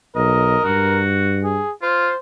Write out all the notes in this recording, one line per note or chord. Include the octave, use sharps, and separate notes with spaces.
B1 A#4 D#5
G2 F#4
G#4
F4 C5